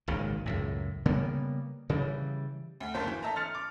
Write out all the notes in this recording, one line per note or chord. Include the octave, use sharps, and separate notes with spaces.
G#1 C#2 A#2 D#3
C#2 F#2 A2
C#3 G3 A#3 B3
C#3 E3 G3
D2
F#1 F#2 A#3 C5 A5 G6
E3
A4 D#5 E5 A5 A#5
C6 F6 A6 C#7 F7
D6